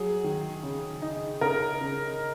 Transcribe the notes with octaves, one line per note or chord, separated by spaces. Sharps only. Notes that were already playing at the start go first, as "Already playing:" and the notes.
Already playing: F#3 G#4
D#3
C#3
D#4
C#3 A#4
C#3